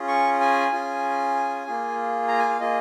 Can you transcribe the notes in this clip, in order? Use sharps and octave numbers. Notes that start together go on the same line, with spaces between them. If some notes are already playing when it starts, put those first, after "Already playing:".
Already playing: C#4 F4 G#4
C#6
G#5
C#4 F4 G#4
A#3 F4 G#4
A#5
G#5
F5
A#3 F4 G#4 D#5